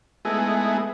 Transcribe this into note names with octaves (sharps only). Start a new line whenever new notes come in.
G#3 A3 B3 D#4 E4 G#4